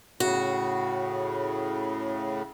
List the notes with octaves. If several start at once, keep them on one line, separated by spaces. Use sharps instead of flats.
A2 C#3 F#4